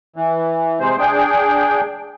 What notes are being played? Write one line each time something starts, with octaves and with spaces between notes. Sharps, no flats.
E3
C3 G#3 C5
D4 G#4 G5